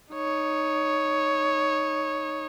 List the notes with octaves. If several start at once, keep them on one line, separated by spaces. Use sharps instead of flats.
D#4 C#5